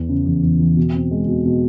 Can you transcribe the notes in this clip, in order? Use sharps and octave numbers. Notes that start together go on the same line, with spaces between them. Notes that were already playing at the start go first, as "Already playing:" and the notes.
Already playing: E2 E3
C#3
E2
E2
E3
B2
C4
G#3
B2
B2